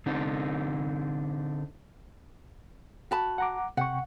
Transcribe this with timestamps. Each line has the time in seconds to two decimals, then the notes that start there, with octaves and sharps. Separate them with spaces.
0.06 D3 C4 D4 D#4
3.11 F#4 A5 B5
3.38 F#5 A#5 D6
3.77 C3 F#5 G5 C#6